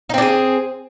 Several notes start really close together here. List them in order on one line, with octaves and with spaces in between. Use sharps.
D#4 C4 D4 G#4